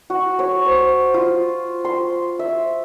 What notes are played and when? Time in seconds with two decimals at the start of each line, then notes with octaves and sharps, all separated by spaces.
0.10 F#4
0.39 C#5
0.65 C5
1.14 F4
1.85 C6
2.39 E5